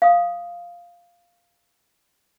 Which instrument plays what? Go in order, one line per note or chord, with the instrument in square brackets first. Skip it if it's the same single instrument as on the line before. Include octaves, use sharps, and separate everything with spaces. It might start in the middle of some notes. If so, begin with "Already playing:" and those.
[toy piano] F5 D#6